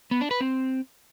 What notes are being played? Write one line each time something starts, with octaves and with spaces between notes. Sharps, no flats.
B3
D4
B4
C4